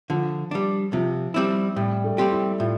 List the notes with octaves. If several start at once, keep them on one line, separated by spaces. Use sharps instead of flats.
D3 F3
G3 D4
C3 F3
G3 C4 E4
A2 G3
A3
G3 C4 G4
E4
A2 F4